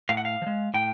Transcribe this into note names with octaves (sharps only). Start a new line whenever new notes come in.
A2 F5
F#5
F5
F3
G#3
A2 G5